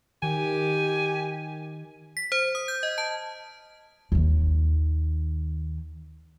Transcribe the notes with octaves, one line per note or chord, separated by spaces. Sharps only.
D#3 G4 G#5
B6
C5
D#6
G6
D#5
A5
D#2 D#3